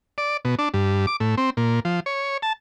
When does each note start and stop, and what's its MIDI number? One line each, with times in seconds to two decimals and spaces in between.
0.18 0.37 74
0.45 0.55 47
0.59 0.69 62
0.74 1.06 43
1.07 1.16 86
1.20 1.35 45
1.38 1.50 60
1.57 1.80 46
1.85 2.00 53
2.06 2.37 73
2.42 2.53 81